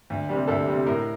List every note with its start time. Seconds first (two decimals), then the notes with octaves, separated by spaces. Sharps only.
0.10 D2
0.29 C3 G3
0.47 D2 A4
0.67 C3 G3
0.86 A2 A#4